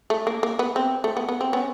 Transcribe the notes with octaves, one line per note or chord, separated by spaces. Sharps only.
A3
A#3
A#3
B3
C4
A3
B3
B3
C4
B3 C#4